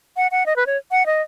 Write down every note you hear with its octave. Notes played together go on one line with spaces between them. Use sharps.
F#5
F#5
D#5
B4
C#5
F#5
D#5